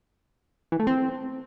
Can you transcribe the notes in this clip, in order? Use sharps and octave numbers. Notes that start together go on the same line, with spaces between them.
E3
A3
C4